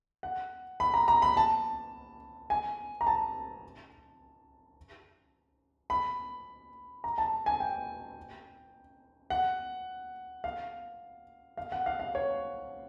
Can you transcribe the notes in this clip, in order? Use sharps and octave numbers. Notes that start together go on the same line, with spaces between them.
F#5
B5
A#5
A#5
B5
A5
G#5
A#5
A5
B5
A#5
A5
G#5
G5
F#5
F5
F5
F#5
F5
F5
C#5